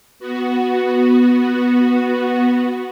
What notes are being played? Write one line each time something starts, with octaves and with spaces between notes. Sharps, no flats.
B3 F#4